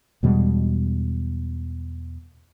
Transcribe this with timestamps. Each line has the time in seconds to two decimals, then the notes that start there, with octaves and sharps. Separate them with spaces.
0.23 E2 B2 G3 G#3